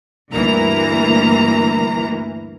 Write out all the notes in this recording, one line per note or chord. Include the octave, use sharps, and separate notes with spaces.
D2 G2 E3 A#3 A#5